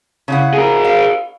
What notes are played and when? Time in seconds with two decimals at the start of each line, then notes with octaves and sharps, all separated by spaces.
0.28 C#3 E4 F#5
0.54 G#4 A#4
0.84 F5